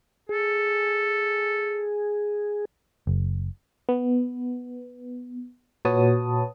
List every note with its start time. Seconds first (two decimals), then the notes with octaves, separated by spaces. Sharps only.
0.29 G#4 A4
3.07 F#1
3.89 B3
5.85 A#2 F#4 B4 C#5 A5 D#6